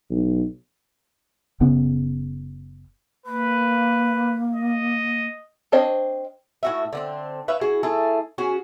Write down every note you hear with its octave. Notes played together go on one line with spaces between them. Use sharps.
B1
F#1 C#3 B3 C#4
A#3 B4
D#5
C4 D4 C5 C#5 D#5
A2 F#4 E5
D3 B3 C4
B4 C#5 E5 F5
E4 F#4 G#4
A3 E4 G#4 A4
C#4 F#4 G#4